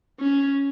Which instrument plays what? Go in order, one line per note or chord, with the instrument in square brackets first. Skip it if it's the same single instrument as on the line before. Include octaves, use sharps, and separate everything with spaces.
[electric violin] C#4